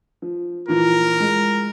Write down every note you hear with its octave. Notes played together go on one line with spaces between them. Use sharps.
F3
A#2 E3 F3 A#4
G#3